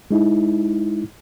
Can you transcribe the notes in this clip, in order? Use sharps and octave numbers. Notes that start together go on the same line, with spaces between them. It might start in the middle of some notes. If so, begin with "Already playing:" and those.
G#3 D#4 E4